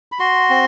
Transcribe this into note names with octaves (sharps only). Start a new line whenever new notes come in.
B5
F#4 C6
C4